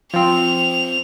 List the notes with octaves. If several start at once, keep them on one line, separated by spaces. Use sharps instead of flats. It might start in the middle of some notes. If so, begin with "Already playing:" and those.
F3 C4 F7